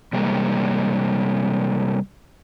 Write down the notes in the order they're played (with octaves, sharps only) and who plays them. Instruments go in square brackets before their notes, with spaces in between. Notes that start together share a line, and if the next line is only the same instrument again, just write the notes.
[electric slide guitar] C3 G3 G#3 A#3